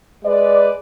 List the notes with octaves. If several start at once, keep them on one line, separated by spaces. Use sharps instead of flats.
G#3 B4 D5